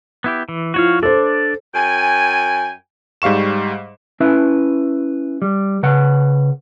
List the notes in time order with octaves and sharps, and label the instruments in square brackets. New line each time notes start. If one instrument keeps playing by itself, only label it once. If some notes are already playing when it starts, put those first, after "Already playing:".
[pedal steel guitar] B3 E4 G4
E3
[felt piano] F3 E4 [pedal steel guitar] F#4 C#5 F5
[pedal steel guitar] D4 D5 [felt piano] A4 C5
[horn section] F#2 G5 G#5
[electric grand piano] G#2 G3 F5 C#6 E7
[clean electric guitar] C#4 E4 B4 E5
G3
C#3 B4 F#5